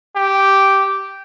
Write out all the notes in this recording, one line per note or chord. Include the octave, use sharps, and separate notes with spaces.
G4